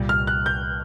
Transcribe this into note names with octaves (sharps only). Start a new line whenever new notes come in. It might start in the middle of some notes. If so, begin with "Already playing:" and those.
Already playing: C2 A#2 G3
F6
F#6
G6